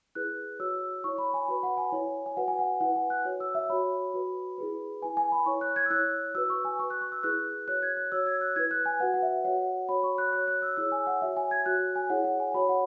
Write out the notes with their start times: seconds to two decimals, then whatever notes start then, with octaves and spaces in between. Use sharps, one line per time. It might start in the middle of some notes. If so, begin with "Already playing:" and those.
0.15 E4 G#4 B4 F#6
0.59 F#4 C#5 E6
1.04 E4 C#5 C#6
1.18 B5
1.34 G#5
1.48 F#4 B4 B5
1.63 F#5
1.78 G#5
1.92 E4 C#5
2.26 G#5
2.37 F#4 B4 F#5
2.48 G#5
2.59 F#5
2.81 E4 B4 F#5
2.96 G#5
3.10 F#6
3.25 F#4 C#5
3.40 E6
3.55 E5
3.70 F#4 C#5 B5
4.14 F#4 B4
4.58 E4 G#4 B4
5.02 E4 B4 G#5
5.17 G#5
5.32 B5
5.46 E4 C#5 C#6
5.61 F#6
5.76 G#6
5.86 E6
5.90 E4 C#5 F#6
6.35 F#4 B4 E6
6.50 C#6
6.65 G#5
6.79 F#4 B4 C#6
6.90 F#6
7.01 C#6
7.12 E6
7.23 E4 G#4 B4 F#6
7.68 F#4 C#5 F#6
7.82 G#6
7.97 F#6
8.12 F#4 C#5 E6
8.26 G#6
8.41 F#6
8.56 E4 B4 G#6
8.71 F#6
8.86 G#5
9.00 F#4 B4 F#5
9.14 F#5
9.22 E5
9.44 F#4 C#5 F#5
9.89 F#4 C#5 B5
10.03 C#6
10.18 F#6
10.33 F#4 C#5 F#6
10.48 F#6
10.62 E6
10.77 E4 G#4 C#5 E6
10.92 G#5
11.07 F#5
11.22 F#4 C#5 E5
11.37 G#5
11.51 G#6
11.66 F#4 C#5 F#6
11.96 G#5
12.10 E4 G#4 C#5 F#5
12.24 F#5
12.40 G#5
12.54 F#4 C#5 B5
12.69 F#5